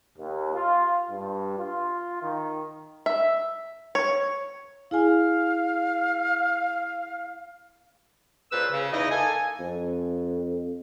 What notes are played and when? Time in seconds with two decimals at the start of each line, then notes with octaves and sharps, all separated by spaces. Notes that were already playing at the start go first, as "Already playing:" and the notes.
0.17 D#2
0.54 F4
1.09 G2
1.58 F4
2.22 D#3
3.06 E5
3.95 C#5
4.91 E4 G#4 F5 G#5
8.52 C#2 A#2 B4 C5 E6
8.72 C#3
8.93 E2 E3 D#4 D#5
9.11 A#3 A4 G#5
9.60 F2